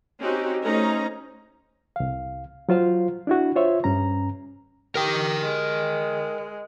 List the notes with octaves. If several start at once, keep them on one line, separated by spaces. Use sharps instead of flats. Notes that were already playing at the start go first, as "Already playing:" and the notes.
C4 C#4 D#4 F#4 G4
A3 C#4 D#4 C5 A#5
C2 F5
F#3 F4 C5 F5
D4 E4 F#4
F4 C5 C#5 E5
G2 C#4 A#5
G4 A#4 G5
G#3